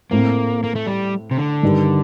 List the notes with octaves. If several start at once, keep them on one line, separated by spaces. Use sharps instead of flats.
A2 A3 A#3 C4
A#3
A3
G3
C3
D3
G2 D#3 G3